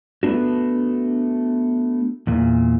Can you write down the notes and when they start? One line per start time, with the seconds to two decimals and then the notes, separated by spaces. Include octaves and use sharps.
0.23 A3 B3 D4 F#4
2.27 E2 A#2